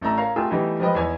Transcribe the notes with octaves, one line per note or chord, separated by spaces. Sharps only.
A1 A3 D5 A#5 E6
A#4 C#5 F5 A#5
A3 F4 G4 G#4 A#4 E6
E3 G3 A3 B3 D#4 G4
F3 G#3 G4 B4 D#5
E2 B3 D#4 C#5 G#5 G#6